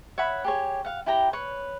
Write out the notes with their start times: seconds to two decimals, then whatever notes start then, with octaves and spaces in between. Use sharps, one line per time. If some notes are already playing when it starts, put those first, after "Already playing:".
0.18 C#5 E5 F#5 B5
0.44 G4 G#4 C#5
0.85 F5 F#5
1.06 E4 G4 G5 A#5
1.33 B4 C#5